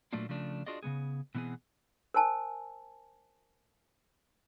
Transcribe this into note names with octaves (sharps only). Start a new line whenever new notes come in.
A#2 F#3 A3 A#3 D4 F4
C#3 F3 A3 D4
D4 F4 F#4 G#4 D5 D#5
C#3 E3 B3 G#4
B2 E3 B3 C4 G#4
A#4 C5 G#5 A5